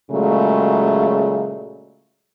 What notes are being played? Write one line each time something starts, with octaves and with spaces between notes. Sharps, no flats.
A#2 C#3 F#3 G#3 A3